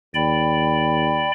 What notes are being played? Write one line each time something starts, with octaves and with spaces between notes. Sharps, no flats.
D#2 D5 G5 B5